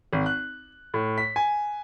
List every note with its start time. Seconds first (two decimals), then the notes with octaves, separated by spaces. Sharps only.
0.13 G#1
0.26 F#6
0.94 A2
1.18 B6
1.36 G#5